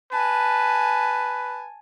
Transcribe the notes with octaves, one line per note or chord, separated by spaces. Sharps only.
B4 G#5 A5